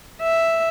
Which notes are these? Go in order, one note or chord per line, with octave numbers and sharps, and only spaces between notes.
E5